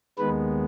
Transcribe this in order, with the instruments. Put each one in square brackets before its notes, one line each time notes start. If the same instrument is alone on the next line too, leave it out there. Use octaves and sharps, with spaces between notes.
[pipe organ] D#2 D#3 G#3 B3 B4